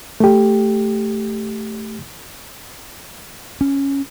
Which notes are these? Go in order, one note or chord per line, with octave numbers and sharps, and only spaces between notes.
A3 G4
C#4